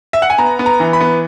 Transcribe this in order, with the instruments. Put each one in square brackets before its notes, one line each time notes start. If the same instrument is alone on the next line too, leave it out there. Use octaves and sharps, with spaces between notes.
[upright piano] E5
F#5
G#5
B3 A#5
B3
A#5
E3
B5
B3